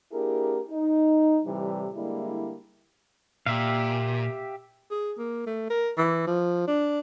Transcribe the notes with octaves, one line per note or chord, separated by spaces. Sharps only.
A#3 D4 E4 G4 G#4 A#4
D#4
A2 C3 E3 G3
D3 G3 G#3 A#3 E4
A#2 G4 E5 F5
G#4
A#3
A3
A#4
E3
F3
D4